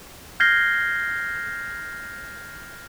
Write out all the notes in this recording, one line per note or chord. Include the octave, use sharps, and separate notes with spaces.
F6 G6 G#6 A#6 C7 G7